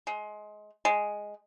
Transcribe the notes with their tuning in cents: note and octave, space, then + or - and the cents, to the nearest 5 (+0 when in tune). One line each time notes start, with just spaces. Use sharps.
G#3 +20
G#3 +0